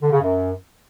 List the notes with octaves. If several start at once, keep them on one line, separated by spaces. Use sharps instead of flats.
D3
C#3
F#2